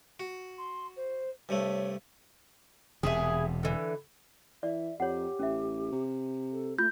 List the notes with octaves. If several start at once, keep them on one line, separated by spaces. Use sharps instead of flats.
F#4
C6
C5
G2 C3 A3 C#5
E1 C3 E4 G#4
D3 E3
E3 D5 E5
F2 G4 C#5 F#5
A1 C#4 E5
C3
A4
A3 F4 G6